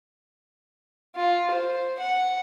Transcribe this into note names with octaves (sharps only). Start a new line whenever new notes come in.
F4
C5
F#5